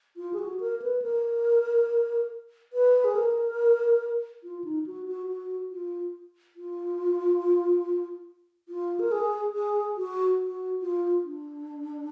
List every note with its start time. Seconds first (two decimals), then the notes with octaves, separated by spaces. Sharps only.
0.17 F4
0.33 G#4
0.39 F#4
0.60 A#4
0.82 B4
1.02 A#4
2.73 B4
3.04 G#4
3.15 A#4
4.44 F4
4.64 D#4
4.86 F#4
5.08 F#4
5.28 F#4
5.71 F4
6.56 F4
8.69 F4
8.99 A#4
9.12 G#4
9.54 G#4
9.97 F#4
10.40 F#4
10.82 F4
11.24 D4